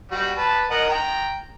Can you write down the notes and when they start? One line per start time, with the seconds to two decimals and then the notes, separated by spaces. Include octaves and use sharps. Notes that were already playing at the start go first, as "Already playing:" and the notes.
0.11 G3 F#4
0.38 B4 A5
0.71 A#4 D#5 F#5
0.89 G5 A#5